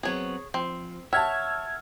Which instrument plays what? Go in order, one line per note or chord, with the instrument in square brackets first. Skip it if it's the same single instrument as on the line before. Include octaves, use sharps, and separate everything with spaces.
[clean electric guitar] F#3 B3 C4 [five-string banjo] G#4 C#5
[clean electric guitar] F3 [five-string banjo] C4
[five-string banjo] C#5 [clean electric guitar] E5 [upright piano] F#5 A5 [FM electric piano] E6 F6 G#6